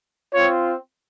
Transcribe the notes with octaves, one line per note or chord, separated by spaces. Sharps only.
C4 F4 C#5